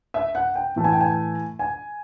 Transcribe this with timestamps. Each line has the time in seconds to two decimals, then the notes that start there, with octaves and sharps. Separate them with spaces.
0.14 E5
0.35 F#5
0.55 G5
0.76 A2 E3 A3
0.84 G#5
0.93 G5
1.01 G#5
1.59 G#5